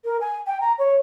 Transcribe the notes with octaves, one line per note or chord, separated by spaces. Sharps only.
A#4
G#5
G5
A#5
C#5